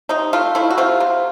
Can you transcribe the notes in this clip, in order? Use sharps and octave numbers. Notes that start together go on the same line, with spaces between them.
C3 D#4
A3 F4
A3 E4
F#4
C3 F4
C3